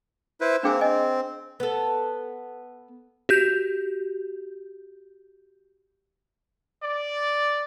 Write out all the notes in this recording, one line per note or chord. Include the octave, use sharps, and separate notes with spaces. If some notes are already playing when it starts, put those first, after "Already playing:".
E4 B4 C5
A#3 C4 D4 G#4 G#5
C4 D#5 G#5
B3 A4
F#4 G4 G6
D5